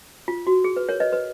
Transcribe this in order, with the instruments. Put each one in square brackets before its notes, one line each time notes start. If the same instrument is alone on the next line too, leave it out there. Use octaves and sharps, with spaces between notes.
[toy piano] F4
F#4
G#4
B4
A#4 C#5
B4 D#5
B4